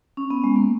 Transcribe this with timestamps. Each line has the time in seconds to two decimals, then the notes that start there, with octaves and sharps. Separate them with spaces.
0.17 C#4
0.30 B3
0.44 G#3
0.56 A#3